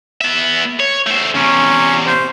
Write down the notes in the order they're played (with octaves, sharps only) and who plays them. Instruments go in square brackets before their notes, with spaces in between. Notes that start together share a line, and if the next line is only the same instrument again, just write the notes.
[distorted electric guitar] B3 E5
C#5
A3 C5
[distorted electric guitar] E2 C3 [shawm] C#4
[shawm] C5